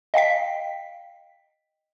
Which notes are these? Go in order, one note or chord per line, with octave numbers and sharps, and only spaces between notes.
D#5 F5 G5 B6